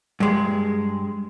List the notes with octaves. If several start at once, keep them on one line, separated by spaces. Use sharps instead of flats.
G2 G#3